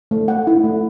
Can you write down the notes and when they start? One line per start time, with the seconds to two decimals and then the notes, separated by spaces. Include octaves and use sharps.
0.11 A3
0.28 F#5
0.47 E4
0.64 A3